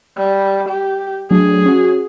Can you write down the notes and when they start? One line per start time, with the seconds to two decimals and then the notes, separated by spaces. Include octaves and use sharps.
0.17 G3
0.69 G4
1.31 F#3 A3 D4 G#4
1.66 C#4 F#4